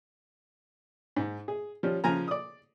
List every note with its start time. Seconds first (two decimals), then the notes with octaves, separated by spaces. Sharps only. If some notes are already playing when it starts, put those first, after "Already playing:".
1.16 G#2
1.48 G#4
1.83 F3 G3 C#4
2.04 C#3 F3 G#5 A#5
2.28 D5 D#6